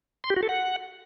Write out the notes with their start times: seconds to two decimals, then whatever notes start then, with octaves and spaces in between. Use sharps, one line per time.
0.24 C6
0.30 G4
0.36 F#4
0.43 A4
0.49 F#5